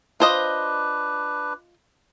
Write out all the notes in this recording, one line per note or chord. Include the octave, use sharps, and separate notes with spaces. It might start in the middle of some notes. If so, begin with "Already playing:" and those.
D4 F4 B4 C5 D#5